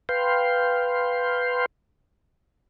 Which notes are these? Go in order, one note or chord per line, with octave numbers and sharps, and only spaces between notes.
B4 F5 G5 C6